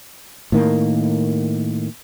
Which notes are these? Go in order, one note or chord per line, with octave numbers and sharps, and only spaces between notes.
A2 D#3 A#3